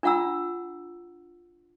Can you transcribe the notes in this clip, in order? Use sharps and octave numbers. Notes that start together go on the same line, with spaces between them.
D4 F4 F#5 A#5 E6